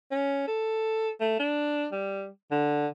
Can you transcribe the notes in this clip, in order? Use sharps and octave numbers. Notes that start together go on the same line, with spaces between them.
C#4
A4
A3
D4
G3
D3